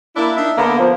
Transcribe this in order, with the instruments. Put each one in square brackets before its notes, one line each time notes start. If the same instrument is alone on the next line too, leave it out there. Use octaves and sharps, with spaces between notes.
[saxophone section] A#3 D4 E4
D4 D#4 E5
[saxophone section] D3 B3 [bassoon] A#3
[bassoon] F3